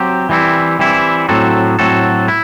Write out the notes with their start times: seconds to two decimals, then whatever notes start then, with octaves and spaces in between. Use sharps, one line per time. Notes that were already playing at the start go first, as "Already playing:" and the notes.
Already playing: F#3 C4 G4
0.29 E3 G3 C4 E4
0.79 E3 G3 C4 E4
1.29 A2 F#3 C4 F#4 A4
1.79 A2 F#3 C4 F#4 A4
2.28 E4